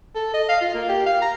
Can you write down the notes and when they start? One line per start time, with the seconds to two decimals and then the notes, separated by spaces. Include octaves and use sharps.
0.15 A4
0.33 D#5
0.49 F5
0.61 F4
0.74 A#3
0.89 G4
1.06 F5
1.21 A#5